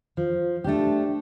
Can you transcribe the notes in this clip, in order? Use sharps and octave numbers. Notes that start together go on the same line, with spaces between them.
F3
A3 D4 G4